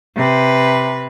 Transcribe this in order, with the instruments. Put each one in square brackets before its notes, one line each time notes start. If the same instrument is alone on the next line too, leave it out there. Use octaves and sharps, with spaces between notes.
[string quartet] C3 B4